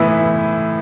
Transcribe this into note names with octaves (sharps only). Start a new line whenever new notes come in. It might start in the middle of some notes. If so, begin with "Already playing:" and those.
Already playing: A2 E3 B3 E4 E6